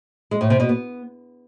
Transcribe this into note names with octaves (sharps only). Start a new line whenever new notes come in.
G#3
A2
C3
B2
B3